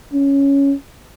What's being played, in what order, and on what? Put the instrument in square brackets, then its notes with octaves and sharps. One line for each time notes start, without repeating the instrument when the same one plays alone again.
[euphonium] C#4